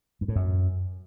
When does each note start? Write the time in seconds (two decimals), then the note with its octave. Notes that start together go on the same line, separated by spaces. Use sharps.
0.21 G2
0.28 A2
0.36 F#2